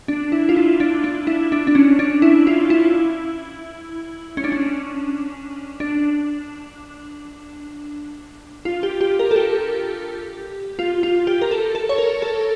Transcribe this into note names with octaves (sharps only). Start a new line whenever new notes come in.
D4
E4
F4
E4
D4
D4
E4
D4
D4
C#4
D4
E4
F4
E4
C#4
D4
C#4
D4
F4
G4
G4
A#4
A4
G4
F4
F4
G4
A#4
A4
A4
C#5
A#4
A4